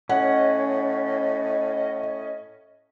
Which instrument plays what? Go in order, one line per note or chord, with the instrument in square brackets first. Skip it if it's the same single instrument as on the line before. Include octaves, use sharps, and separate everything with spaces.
[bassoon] A2 [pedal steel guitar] C#4 [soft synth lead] D#5 [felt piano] F#5